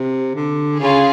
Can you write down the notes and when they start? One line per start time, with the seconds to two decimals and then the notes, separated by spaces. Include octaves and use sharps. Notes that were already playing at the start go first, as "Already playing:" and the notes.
Already playing: C3
0.35 D3
0.80 C#3 C#4 F4 G#4